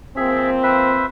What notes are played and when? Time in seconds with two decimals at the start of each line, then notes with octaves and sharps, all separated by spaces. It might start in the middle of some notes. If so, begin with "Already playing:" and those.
0.17 F3 A#3 C4 G#4 E5
0.63 B4 C5 E5